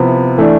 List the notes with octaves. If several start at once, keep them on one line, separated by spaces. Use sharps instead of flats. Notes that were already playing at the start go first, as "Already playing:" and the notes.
Already playing: C3 F3 B3 E4
E3 A3 D4